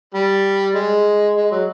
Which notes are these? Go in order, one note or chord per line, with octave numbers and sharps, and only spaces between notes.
G3
G#3
G#3
F#3